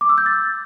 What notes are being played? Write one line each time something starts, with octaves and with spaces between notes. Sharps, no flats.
D6
E6
G6
A6